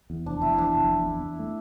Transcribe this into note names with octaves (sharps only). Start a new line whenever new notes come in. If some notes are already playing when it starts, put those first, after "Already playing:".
E2
F1 D4
F1 E4
E4
E2 D4
F1
E2
E2
E2
A3